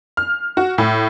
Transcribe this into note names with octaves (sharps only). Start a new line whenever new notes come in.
F6
F#4
A2